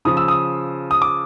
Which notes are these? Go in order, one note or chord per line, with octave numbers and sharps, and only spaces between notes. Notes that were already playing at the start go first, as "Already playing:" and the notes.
C#3 F3 D#6
E6
D#6
D#6
D6